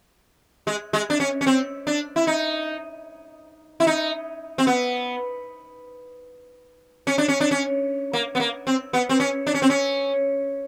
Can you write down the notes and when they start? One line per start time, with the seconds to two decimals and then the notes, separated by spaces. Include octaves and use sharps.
0.67 G#3
0.93 G#3
1.10 D4
1.20 C#4
1.41 C#4
1.46 C4
1.87 D4
2.16 E4
2.27 D#4
3.80 E4
3.87 D#4
4.58 C4
4.67 B3
7.07 C#4
7.18 D4
7.28 C#4
7.40 D4
7.51 C#4
8.13 A#3
8.35 B3
8.40 A#3
8.67 C4
8.93 B3
9.09 C4
9.20 C#4
9.47 D4
9.54 C#4
9.62 C4
9.70 C#4